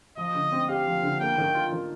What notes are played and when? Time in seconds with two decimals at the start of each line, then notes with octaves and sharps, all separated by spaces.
0.17 F3 D#5
0.34 D3
0.52 C4
0.69 G4 F5
0.86 F3
1.03 D3
1.20 A#3 G5
1.38 D#3
1.55 F4
1.72 D#3